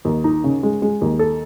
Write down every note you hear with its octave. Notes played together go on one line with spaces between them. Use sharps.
D#2
D#4
C#3
G#3
G#3
D#2
A4